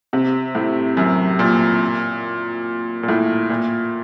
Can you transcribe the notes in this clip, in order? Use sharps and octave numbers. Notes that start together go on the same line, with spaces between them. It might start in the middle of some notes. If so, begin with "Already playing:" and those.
C3
A2
F#2
A#2
A#2
A2
A#2